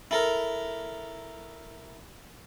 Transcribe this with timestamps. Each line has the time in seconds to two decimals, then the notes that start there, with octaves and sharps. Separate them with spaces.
0.11 E4 A4 A#4